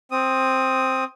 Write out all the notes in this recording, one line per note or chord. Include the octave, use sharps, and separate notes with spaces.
C4 D#6